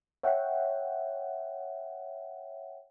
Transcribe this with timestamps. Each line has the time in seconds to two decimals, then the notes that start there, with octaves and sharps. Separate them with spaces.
0.23 C#5 E5 F#5 G5